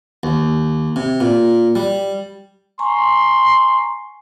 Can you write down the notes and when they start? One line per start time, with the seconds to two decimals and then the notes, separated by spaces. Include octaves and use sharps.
0.23 D#2
0.96 C3
1.21 A#2
1.75 G3
2.79 G#5 A#5 C6 C#6